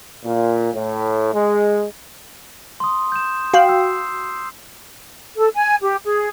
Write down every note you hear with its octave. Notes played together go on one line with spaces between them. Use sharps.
A#2
A2
G#3
C6 D#6
G6 E7
F#4 F5 G5 C7
E6
A4
G#5
G4
G#4